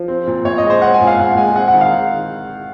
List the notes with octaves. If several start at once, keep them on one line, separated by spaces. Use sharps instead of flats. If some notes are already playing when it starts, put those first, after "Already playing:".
Already playing: F3
C4
A#2
A#2 C#5
D#5
G#3
C5
C4 F#5
G#5
A#2
F5
A#2 F#5
G#3 G#5
C4 F#5
F#5
D#3
F5